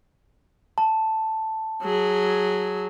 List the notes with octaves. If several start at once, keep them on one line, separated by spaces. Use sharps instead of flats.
A5
F#3 G#4